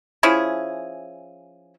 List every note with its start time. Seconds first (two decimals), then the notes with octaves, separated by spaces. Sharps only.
0.23 F3 C#4 E4 G#4